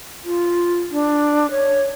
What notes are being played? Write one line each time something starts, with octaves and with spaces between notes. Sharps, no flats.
F4
D4
C#5